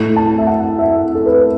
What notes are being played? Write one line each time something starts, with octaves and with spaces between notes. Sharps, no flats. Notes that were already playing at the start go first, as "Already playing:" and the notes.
Already playing: A2 A3
A5
E5
F#5
E5
A4
B4